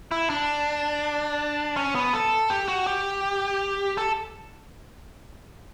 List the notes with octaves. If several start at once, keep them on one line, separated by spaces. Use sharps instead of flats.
E4
D4
C#4
B3
A4
G4
F#4
G4
A4